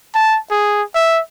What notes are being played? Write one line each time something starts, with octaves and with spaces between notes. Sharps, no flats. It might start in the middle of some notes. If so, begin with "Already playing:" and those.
A5
G#4
E5